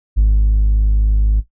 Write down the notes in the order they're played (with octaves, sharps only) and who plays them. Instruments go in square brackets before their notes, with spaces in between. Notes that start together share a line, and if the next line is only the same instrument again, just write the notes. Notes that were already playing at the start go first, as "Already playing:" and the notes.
[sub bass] G#1